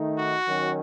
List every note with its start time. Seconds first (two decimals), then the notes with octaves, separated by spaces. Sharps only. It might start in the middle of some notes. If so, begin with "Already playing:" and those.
Already playing: D#3 A3 D#4
0.17 F#4
0.46 D#3 F#3 C#4